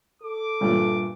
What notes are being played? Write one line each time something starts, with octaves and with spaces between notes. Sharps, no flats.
A4 D6
G2 A#2 A3